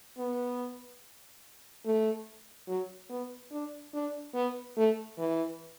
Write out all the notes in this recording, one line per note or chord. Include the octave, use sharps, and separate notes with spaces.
B3
A3
F#3
B3
D4
D4
B3
A3
E3